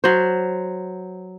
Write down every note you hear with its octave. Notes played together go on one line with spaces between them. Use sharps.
F#3 C5